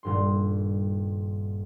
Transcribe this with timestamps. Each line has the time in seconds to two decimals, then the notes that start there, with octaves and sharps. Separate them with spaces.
0.03 D#1 G2 C6